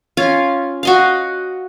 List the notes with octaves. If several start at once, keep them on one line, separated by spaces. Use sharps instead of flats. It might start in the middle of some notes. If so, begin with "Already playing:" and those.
C#4 F4 F5
F#4 D#5 F5